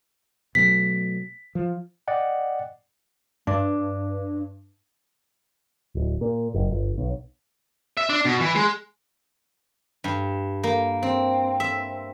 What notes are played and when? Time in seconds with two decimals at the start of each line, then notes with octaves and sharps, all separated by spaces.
0.55 B2 F#3 A3 B6
1.55 F3
2.08 D5 D#5 F#5 G5
3.47 G2 D4
5.95 D1
6.21 A#2
6.54 F#1
6.71 G1
6.98 B1
7.97 E5
8.09 D4
8.25 B2
8.40 E3
8.56 G#3
10.04 G2
10.63 A#3
11.03 C4
11.60 E5